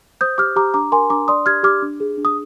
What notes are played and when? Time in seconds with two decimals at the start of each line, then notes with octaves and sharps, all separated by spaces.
0.21 C5 D#6 G6
0.38 G4 D6 F6
0.56 G4 A#5 D6
0.74 D4 A#5 D6
0.92 A#4 G#5 C6
1.10 D4 A#5 D6
1.28 D5 C6 D#6
1.46 G4 F6 G#6
1.63 G4 D6 F6
1.82 D4
2.00 G#4
2.18 D4
2.25 D#6